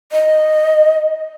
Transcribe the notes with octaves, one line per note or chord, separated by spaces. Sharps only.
D#5